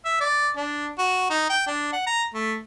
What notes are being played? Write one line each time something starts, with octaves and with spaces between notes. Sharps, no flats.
E5
D5
D4
F#4
D#4
G5
D4
F#5
A#5
A3